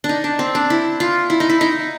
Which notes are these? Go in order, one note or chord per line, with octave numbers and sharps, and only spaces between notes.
D4
D#4
D4
C4
D4
E4
F4
E4
D#4
E4
D#4